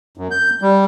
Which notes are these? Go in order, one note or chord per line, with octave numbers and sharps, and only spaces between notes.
F#2
G6
G3